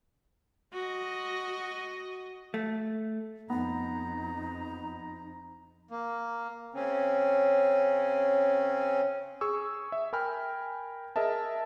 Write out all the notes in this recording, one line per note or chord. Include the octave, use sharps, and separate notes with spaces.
F#4 D#5
A3
F2 B3 D#4 A#5
A#3
C#3 C4 C#4
G#4 C#6 E6
E5
A#4 G5 G#5 B5 F6
G#4 A#4 D#5 E5 A5